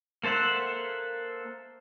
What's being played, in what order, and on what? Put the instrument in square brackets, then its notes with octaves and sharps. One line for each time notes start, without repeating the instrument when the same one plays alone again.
[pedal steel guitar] A#3 A4 C5 E5 F#5